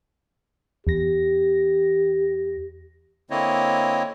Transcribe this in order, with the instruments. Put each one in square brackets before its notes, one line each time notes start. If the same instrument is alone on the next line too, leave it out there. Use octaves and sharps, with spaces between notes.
[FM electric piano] E2 A#6 [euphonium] G4
[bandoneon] D3 A#3 C4 E4 C#5 D#5